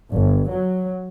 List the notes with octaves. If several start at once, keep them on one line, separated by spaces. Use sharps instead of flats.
G1
F#3